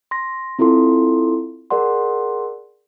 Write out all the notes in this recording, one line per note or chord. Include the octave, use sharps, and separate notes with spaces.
C6 A#6
C4 E4 F4 A4 C6
G#4 A#4 D5 F#5 C6